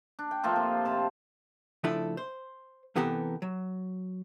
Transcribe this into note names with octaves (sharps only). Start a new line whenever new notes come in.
D4
G5
F3 A3 A#3 F4
C3
C3 A5
C#3 F3 A3 D4 E4 A4
C5
C3 E3 B3 G4 A4 A#4
F#3